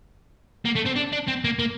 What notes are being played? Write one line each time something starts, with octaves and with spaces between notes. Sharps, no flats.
A#3
A3
C4
D4
D4
C4
A#3
A#3